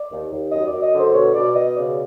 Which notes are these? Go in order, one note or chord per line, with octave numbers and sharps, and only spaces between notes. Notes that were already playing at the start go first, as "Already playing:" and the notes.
Already playing: D5
D#2
D#2
F#2 D#5
D5
F#2
D#5
D3
C5
B2 C#5
B2 D5
B2 D#5
C#3 D5